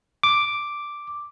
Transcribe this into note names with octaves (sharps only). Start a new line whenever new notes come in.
D6